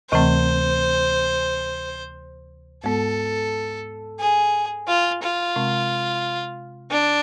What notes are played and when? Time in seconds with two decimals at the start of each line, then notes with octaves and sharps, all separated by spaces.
0.11 D2 C3 E3 A3 C4 C5
2.84 G#2 G#3 B3 A4
4.19 G#4
4.88 F4
5.22 F4
5.56 C3 G#3 C4
6.91 D4